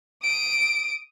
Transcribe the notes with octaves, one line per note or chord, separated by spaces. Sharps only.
D#6 D7